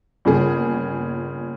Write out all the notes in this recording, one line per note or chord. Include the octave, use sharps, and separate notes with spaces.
G1 A#2 C#3 G#4